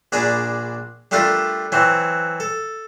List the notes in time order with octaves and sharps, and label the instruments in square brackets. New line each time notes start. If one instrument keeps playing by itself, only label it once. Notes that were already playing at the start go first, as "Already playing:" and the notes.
[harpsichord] A#1 D4 G#4 D5 A#5 B5
G3 A3 D4 F4 A4 A#4
E3 F#3 C4
A4